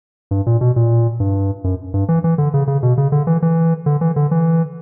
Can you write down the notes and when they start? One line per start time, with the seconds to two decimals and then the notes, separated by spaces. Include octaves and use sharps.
0.31 G2
0.46 A#2
0.61 B2
0.76 A#2
1.20 G2
1.64 F#2
1.94 G2
2.09 E3
2.24 E3
2.38 D3
2.54 C#3
2.67 C#3
2.83 B2
2.98 C#3
3.12 D3
3.27 E3
3.42 E3
3.86 D3
4.01 E3
4.16 D3
4.31 E3